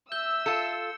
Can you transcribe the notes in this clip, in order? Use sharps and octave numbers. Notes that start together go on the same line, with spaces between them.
E5 E6 G6 G7
F4 A4 C#7